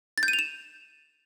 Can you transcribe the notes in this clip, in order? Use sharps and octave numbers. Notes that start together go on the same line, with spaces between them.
A6
G6
D#7
F7
E7